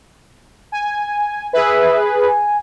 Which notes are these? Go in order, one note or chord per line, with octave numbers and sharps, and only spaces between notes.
G#5
G#4 B4 E5
G#5